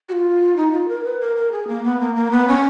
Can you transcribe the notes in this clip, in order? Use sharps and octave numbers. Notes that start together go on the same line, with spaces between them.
F#4
F4
D#4
F4
A#4
B4
A#4
A#4
G#4
A#3
B3
A#3
A#3
B3
C#4